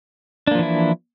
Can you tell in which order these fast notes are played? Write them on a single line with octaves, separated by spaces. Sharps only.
D4 A#3 F3 E3 E4